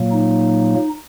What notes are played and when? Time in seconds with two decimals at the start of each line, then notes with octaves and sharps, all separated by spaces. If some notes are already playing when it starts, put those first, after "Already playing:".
Already playing: A#2 F#3 A#3
0.12 D#4